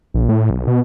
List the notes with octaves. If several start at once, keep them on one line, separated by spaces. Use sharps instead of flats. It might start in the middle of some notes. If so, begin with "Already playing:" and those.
A#1
A2
B1
B2